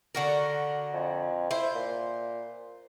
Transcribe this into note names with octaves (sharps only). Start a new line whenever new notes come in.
D3 F#4 A#4
F2
E4 C5
A#2